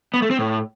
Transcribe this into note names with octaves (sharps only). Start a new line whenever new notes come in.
B3
A3
C4
A2